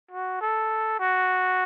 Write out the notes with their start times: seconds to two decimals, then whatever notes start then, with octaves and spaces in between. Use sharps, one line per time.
0.11 F#4
0.41 A4
1.00 F#4